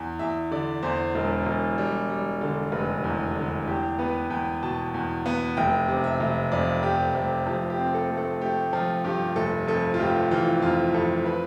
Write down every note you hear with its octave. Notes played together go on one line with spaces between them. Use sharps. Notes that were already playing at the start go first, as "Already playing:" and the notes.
Already playing: E2
E2 E5
D3 D5
E2 C5
E1
E1
G3
G3
D3
F1 B4
E2
D3
E2 G4
B3 B4
E2 G5
B2 A5
E2
B3
F1 G5
C3
E5
F1
F2 D5
F1 G4
F1 G4
F3 G4
G4
C4
A4
A3
A4
A3 G4
F3 F4
G2 G4
F1 A4
F2 A4
F4
F1 G4
E3 F4
F2 F4
F2 A4
B4